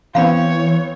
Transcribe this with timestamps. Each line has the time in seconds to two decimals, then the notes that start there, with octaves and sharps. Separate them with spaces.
0.15 E3 B3 C4 C#5 F5 B5